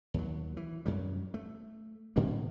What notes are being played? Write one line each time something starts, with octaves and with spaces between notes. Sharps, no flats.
D#2 F#3
E3
F#2 F#3 G3
A3
A2 D3 D#3 A#3